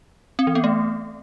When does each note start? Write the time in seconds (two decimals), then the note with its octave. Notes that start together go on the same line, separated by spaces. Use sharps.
0.39 C4
0.47 E3
0.55 B3
0.64 A3